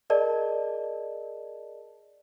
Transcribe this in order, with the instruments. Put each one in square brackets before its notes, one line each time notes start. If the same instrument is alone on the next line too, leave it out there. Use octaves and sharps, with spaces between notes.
[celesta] G#4 A#4 D5 D#5 A5